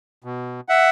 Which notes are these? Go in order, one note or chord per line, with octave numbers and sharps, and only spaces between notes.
B2
E5 F#5